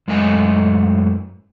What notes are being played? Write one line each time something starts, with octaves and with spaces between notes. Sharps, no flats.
F#2 G#3 A3 A#4 D#5 G#5